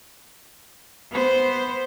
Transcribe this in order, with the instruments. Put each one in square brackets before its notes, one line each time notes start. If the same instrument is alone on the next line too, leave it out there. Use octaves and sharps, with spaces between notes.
[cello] B3 C5